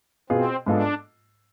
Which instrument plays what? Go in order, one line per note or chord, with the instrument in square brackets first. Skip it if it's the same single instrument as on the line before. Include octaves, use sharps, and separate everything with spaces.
[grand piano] B2 B3 F4 G#4 [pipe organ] C4
[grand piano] G#2 G#3 B3 F4 A4 [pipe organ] D4